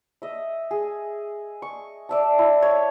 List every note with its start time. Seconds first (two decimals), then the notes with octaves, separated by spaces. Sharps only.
0.22 D#5 E5
0.71 G#4
1.62 C#6
2.09 D5 E5 A5
2.39 E4
2.62 C#5